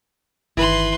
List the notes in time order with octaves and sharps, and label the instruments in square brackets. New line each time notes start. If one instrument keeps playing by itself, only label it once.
[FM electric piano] G1 D#3 [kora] E3 [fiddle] B4 C6